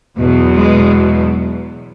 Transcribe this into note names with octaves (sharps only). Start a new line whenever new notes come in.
E2 B2 F#3
G#3